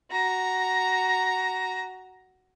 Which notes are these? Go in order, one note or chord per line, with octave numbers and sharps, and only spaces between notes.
F#4 A#5